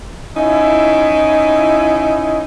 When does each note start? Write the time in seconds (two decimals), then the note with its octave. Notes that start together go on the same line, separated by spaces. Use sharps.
0.36 C#4 D#4 E4